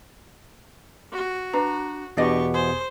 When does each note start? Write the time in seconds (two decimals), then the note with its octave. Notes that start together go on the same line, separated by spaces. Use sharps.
1.12 F#4
1.53 D4 B4 A#5
2.17 E2 B2 B3 D4 G4 D5 D#5 C#6
2.54 G#4 C5